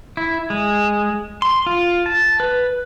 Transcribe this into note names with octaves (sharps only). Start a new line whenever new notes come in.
E4
G#3
C6
F4
A5
B4